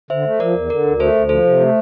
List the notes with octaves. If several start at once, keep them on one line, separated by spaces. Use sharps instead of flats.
D3 C5 E5
A3
F3 A#4 D5
E2
D3 A#4 D5
D2
A3 A4 C5
D2
F3 A4 C5
C3
A3